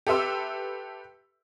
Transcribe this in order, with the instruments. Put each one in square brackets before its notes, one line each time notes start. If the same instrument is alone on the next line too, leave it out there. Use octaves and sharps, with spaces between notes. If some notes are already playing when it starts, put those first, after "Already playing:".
[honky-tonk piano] G4 A4 B4 E5 C6 E6